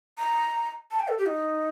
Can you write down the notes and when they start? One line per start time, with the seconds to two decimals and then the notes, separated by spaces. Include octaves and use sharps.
0.18 A#5
0.91 A5
1.00 G5
1.08 A4
1.18 G4
1.26 D#4